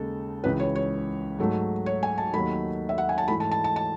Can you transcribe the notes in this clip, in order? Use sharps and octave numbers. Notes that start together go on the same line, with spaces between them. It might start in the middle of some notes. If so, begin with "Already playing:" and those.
Already playing: D#2 C#3 G#3 A4
C#2 C#3 E3 B4
C#5
C#5
G#2 F#3 A3
C#5
G#5
A5
D#2 D#3 F#3 A3 B5
E5
F#5
G#5
A5
G#2 E3 A3 B5
A5
A5
A5
A5